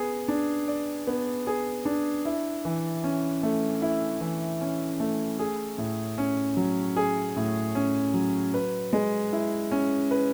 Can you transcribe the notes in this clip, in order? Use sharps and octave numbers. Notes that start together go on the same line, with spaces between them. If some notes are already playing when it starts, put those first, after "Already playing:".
Already playing: B3 G#4
D4
D5
B3
G#4
D4
E4
E3
C#4
A3
E4
E3
C#4
A3
G#4
A2
C#4
F#3
G#4
A2
C#4
F#3
B4
G#3
E4
C#4
B4